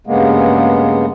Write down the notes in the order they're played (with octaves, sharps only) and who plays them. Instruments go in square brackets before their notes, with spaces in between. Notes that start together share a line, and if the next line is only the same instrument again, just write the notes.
[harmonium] G2 C#3 G#3 A#3 B3